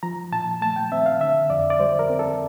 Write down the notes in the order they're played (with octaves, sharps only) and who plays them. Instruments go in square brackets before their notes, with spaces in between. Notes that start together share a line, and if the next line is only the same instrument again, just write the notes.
[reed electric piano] F3 A#5
A#2 A5
A3 A5
G5
C4 E5
F5
D3 E5
F2 D5
D5
G3 C5
A#4
C4
A4